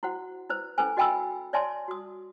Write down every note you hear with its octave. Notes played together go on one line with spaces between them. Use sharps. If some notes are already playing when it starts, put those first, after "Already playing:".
E4 F#4 C5 F#5
E4 B4 C5
C#4 E4 A4 B4 C5 G#5
F#4 D#5 G5 G#5 B5 E6
C#5 D5 E5 G#5 A5 C6
F#4 D#6